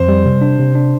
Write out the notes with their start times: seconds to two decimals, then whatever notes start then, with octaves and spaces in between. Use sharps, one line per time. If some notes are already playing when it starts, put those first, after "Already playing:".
Already playing: F2 C5
0.08 G3
0.26 C3
0.42 D4
0.59 C3
0.75 D4